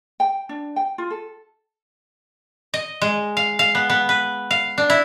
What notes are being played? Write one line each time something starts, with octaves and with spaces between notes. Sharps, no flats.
G5
D4
G5
F4
A4
D#5
G#3
F5
F5
B3
B3
B4
F5
D4
E4